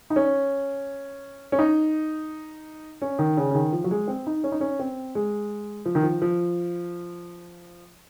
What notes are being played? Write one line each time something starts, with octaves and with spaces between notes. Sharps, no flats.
D#4
C#4
C#4
D#4
C#4
D#3
C#3
C#3
D#3
F3
F#3
G#3
C4
D#4
C#4
D#4
C#4
C4
G#3
F3
D#3
F3
F3